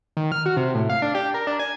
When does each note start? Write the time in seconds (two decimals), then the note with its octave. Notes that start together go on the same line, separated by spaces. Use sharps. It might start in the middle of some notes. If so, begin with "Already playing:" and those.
0.17 D#3
0.32 F6
0.46 F#4
0.57 C3
0.75 A2
0.90 F5
1.02 D4
1.15 G4
1.34 A#4
1.47 D4
1.59 G#5